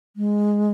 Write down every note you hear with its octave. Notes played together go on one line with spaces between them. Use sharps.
G#3